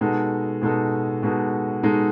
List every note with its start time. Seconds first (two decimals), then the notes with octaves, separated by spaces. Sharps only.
0.01 B2 G#3 D#4 F#4 A4
0.62 B2 G#3 D#4 F#4 A4
1.23 B2 G#3 D#4 F#4 A4
1.83 B2 G#3 D#4 F#4 A4